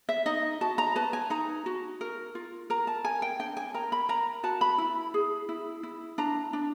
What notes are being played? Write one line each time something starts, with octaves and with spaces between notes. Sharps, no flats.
E5
D#4 D#5
F#4 A5
A#5
B4 A5
G#5
D#4 A#5
F#4
A#4
F4
A#4 A#5
A5
A#4 G#5
G5
D4 G5
G#5
A#4 A#5
B5
A#4 A#5
F#4 A5
B5
E4
G#4
E4
E4
D4 A#5
D4